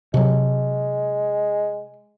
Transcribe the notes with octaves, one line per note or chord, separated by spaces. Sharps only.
C3 F#3 G#3